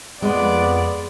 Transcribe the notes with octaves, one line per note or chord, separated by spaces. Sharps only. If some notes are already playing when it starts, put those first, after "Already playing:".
F2 G#3 B3 D5